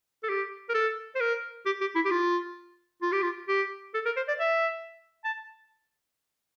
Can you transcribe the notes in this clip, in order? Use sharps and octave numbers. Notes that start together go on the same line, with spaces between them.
A4
G4
A#4
A4
C5
A#4
G4
G4
E4
G4
F4
F4
G4
F4
G4
A4
A#4
C5
D5
E5
A5